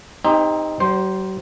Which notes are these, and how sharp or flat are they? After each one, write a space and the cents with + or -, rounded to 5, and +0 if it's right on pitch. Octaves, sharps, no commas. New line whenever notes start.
C4 +0 D#4 +0 G4 +40
F#3 +45 C5 +0